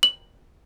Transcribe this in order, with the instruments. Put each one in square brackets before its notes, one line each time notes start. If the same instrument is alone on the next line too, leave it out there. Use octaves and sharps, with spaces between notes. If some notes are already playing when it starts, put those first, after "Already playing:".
[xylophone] F#7